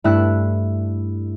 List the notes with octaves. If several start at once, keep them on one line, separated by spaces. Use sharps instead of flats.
G2 A3 E4 E6 F#6